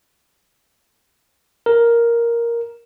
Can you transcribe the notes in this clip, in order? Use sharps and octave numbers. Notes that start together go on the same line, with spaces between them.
A#4